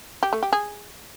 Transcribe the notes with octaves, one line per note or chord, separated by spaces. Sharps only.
G4
A3
G4
G#4